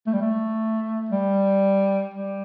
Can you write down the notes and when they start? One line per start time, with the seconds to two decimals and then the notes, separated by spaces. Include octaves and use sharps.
0.07 A3
0.13 G3
0.21 A3
1.10 G3
2.14 G3